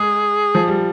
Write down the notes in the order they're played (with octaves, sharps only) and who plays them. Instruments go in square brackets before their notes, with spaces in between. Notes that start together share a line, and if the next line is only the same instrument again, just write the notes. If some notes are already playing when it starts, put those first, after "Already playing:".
Already playing: [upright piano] G#3 [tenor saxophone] G#4
[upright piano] F3
G3